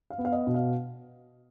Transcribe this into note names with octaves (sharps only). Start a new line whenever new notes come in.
F5
B3
F5
D#5
B2
F5